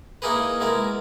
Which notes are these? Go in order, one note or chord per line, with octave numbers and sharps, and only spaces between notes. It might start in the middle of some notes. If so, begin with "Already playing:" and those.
A#3 D#4 E4 G#4 A#4 B4
G#3 B3 E4 A#4